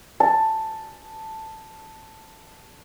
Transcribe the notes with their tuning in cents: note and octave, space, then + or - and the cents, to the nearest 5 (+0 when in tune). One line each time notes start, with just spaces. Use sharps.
A5 +5